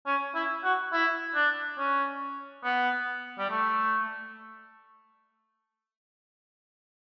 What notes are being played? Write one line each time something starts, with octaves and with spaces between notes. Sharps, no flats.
C#4
E4
F#4
E4
D4
C#4
B3
G3
A3